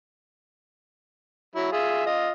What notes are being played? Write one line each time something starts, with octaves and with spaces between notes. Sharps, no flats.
F#3 E4
F4 G#4 E5
F4 D#5